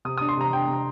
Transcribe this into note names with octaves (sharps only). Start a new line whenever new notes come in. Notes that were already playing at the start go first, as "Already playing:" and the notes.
C3 D#6
D4 D#6
C6
C3 A#5
D4 G5
C3